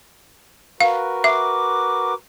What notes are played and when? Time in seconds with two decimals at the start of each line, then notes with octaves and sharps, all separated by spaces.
0.81 F#4 A#4 B4 F5
1.24 E5 D6